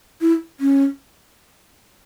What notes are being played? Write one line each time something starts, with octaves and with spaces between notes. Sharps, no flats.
E4
C#4